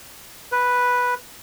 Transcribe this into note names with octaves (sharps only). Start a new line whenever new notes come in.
B4